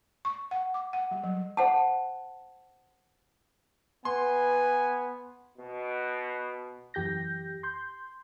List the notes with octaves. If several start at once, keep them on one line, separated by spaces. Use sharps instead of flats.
C#6
F#5
D6
F#5
G3
F#3
C5 F#5 A5
B3 B4 G#5 C6
B2
F#2 E3 G4 G6 A#6
C6 G6